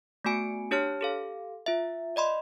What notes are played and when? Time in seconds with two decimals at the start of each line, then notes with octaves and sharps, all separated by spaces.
0.25 A3 B3 F#4 G#5 D7
0.71 D4 G4 C#5 A5 F6
1.01 G4 A4 F5
1.66 F4 E5
2.16 D5 D#5 B5 C6